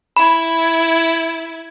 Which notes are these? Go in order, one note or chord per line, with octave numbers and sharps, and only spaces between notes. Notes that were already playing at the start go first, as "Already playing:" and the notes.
E4 B5 G#6